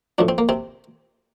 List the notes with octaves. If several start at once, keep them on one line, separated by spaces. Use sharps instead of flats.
A2 F3 D4
C4
A#3
C3 C4